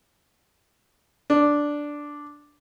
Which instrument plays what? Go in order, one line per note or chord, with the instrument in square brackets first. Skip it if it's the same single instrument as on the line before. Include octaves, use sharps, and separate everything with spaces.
[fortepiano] D4